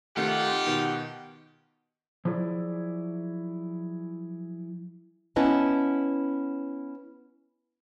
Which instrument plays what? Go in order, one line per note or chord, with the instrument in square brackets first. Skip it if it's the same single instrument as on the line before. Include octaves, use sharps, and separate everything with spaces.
[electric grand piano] C3 D#3 A3 [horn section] D#4 F4 G4 [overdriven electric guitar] F#5
[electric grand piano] B2 D#3
[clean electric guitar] F3 F#3 E4 G#4 D5
[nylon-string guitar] B3 C#4 E4 B4 D#5 A5